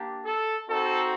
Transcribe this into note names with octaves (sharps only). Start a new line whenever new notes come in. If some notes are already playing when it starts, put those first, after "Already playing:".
Already playing: A#3 D4 G4
A4
C4 D#4 F#4 A4